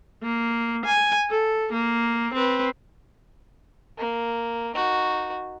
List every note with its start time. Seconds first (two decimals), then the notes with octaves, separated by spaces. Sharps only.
0.23 A#3
0.85 G#5
1.30 A4
1.73 A#3
2.34 C4 B4
3.98 A#3
4.75 D#4 F#4